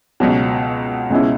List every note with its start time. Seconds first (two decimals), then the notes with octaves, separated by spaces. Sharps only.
0.20 C#2 B2 F#3
1.10 C#2 B2 G#3 C#4 E4